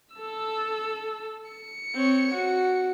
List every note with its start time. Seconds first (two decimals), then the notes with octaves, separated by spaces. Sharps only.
0.15 A4 E6
1.51 C#7
1.94 C4 C#5
2.33 F#4